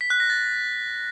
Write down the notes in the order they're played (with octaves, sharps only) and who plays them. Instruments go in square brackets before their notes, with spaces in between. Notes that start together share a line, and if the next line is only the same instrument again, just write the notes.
[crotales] B6
F#6
A#6
A6